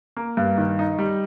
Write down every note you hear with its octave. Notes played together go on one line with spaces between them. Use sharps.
A#3
G2
D#3
D#4
G3